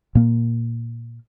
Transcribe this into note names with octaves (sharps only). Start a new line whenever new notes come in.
A#2 A#3